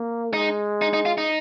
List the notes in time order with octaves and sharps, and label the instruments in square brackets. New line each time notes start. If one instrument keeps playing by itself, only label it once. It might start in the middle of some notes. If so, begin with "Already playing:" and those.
Already playing: [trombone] A#3
[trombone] G#3 [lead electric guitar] D#4
[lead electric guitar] D#4
D#4
F4
D#4